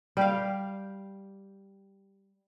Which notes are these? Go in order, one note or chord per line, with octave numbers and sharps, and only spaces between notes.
G3 G4 F5